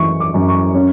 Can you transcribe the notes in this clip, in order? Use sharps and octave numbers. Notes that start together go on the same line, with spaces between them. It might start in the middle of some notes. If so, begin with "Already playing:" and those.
Already playing: F#2 E3 C#6
D6
F#2
C#6
C#4